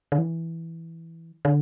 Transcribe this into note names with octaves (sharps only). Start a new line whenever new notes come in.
D3
E3
D3